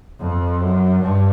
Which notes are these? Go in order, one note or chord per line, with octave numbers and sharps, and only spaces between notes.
F2
F#2
G2